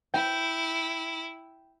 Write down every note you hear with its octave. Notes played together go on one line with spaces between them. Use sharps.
E4 G5